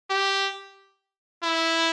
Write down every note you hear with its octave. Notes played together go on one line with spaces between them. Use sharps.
G4
E4